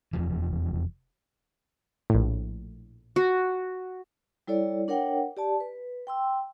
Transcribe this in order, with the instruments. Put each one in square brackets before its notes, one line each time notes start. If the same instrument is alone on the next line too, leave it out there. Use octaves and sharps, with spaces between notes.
[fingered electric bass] F1 E2 F3
[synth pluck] A#1 A2
[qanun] F#4
[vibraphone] G3 E4 A4 C#5 D5
D4 A#4 C#5 F#5 G5
G4 D5 A5
B4
G5 C6 E6